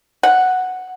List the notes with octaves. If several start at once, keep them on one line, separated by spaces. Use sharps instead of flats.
F#5